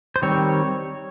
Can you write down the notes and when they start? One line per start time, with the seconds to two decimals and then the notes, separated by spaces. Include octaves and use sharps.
0.16 C5
0.22 D#3 G3 C4 C#5